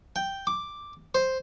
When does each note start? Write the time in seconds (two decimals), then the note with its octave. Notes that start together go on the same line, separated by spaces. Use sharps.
0.16 G5
0.47 D6
1.15 C5